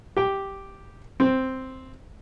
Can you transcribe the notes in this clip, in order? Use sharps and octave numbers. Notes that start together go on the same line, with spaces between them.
G4 G5
C4